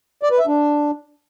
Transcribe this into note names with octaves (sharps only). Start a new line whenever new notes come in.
D5
B4
E5
D4